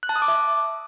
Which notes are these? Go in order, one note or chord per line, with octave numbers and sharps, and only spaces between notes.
F#6
A5
D#6
D6
E5